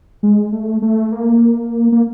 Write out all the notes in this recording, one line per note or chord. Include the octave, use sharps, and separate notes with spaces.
G#3
A3
A3
A#3
A#3